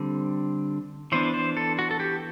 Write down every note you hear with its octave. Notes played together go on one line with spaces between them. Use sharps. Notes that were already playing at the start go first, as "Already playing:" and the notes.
Already playing: D3 G3 C4
E3 B3 D4 C5
C5
A4
F#4
A4
G4